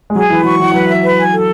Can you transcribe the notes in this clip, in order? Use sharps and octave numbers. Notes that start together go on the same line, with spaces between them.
G#3
F#3 G#4
E3 B4
F#3 C#6
E3 F#5
F#3 B4
E5
B4
G#5
A4